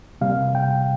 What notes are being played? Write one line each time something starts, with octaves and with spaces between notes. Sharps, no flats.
C3 G3 A#3 F5
G5